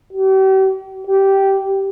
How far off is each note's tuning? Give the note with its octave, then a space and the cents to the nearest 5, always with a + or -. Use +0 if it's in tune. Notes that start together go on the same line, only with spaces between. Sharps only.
G4 -40
G4 -10